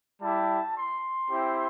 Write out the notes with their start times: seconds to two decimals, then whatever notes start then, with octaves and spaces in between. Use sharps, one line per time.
0.22 G3 E4 G4 A5
0.76 C6
1.31 C4 E4 G4